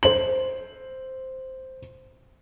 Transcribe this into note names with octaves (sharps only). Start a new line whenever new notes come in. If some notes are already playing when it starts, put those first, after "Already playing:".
C5 F#7